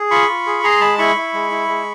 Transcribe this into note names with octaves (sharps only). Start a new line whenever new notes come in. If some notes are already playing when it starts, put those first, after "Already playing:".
Already playing: G#4
F4 B5 C#6
F4
G#4
G#4 A#5 C6
G#3 A5 B5
E4 B5 C#6
E4
G#3
E4
G#3